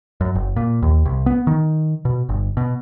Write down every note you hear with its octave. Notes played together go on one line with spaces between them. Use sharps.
F#2
F#1
A#2
D#2
C2
B3
D#3
B2
G1
B2